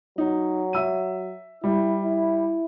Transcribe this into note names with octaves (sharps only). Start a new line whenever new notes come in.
F#3 D#4
E5 E6 D#7
G3 E4
E4